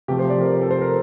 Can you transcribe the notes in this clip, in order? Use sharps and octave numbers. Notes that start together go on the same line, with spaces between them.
C3 F3 A3 G4
C5
D5
A#4
A4
C5
A#4